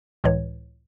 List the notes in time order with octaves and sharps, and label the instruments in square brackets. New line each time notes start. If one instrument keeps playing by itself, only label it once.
[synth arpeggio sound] C#2 A2 E3 C#5